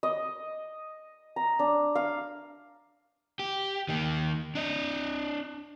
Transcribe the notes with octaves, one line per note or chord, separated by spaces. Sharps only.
D#5
A#5
D4
F5
G4
D#3 A#3
D4 D#5